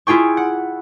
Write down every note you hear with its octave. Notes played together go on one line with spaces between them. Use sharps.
E4 F4 G#4 G5 C#6
F#5